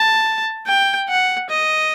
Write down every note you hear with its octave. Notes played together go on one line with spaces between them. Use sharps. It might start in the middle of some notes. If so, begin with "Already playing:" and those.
Already playing: A5
G5
F#5
D#5